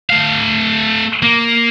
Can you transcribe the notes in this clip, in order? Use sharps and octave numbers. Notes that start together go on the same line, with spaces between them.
A3 F5
A#3